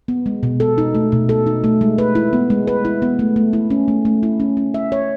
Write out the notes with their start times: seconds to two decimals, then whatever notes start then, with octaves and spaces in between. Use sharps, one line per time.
0.08 B3
0.26 G#3
0.43 B2
0.60 A4
0.78 D#4
0.95 A3
1.12 B2
1.29 A4
1.47 D#4
1.64 A3
1.81 G#3
1.98 B4
2.15 E4
2.33 B3
2.50 G#3
2.67 B4
2.85 E4
3.02 B3
3.19 A3
3.36 A3
3.53 E4
3.70 C#4
3.88 A3
4.05 A3
4.23 E4
4.40 C#4
4.57 C#4
4.74 E5
4.92 C#5